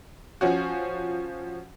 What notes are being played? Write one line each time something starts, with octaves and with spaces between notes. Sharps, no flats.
F3 C#4 F#4